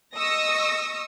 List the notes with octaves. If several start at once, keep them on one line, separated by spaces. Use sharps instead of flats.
D#5 C#6 D#6 E6 A#6